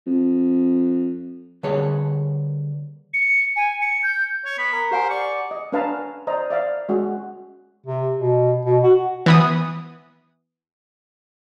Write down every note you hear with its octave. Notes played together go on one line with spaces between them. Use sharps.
F2
D3 G3 A#3 G#4 B4 C#5
C#7
G#5
C#7
G6
C#5
B3 B5
A#4
G4 C5 F#5 G#5
D5 C#6
D#5
C#4 D4 B4 F5 A5 A#5
C5 D5 D#5 A#5
D5 E5 F5
G#3 C#4 F#4
C3
B2
B2
F#4
E3 B3 D#6